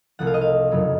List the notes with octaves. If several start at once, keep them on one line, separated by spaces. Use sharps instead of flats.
C2 C3 F3 A3 F#5
F5
D#5
F5
F#1 F2 C#3 F#3